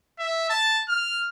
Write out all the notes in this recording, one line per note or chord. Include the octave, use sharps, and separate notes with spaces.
E5
A5
F6